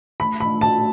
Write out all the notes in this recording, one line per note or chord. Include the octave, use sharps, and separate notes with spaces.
A3 B5
A3 B5
F#4 A5